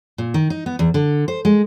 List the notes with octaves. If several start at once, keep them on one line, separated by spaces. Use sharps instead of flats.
A#2
D#3
D#4
B3
E2
D3
C5
G#3